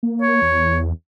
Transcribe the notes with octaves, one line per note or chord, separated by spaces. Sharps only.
A#3
C#5
E2